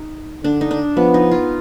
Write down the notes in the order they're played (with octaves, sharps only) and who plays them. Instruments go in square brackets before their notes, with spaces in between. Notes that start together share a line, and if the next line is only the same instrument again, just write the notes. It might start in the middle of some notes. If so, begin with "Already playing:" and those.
Already playing: [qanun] D#4
[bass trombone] D3 [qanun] D4
[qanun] D#4
D4
[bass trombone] F3 [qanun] B3
[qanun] D#4
F4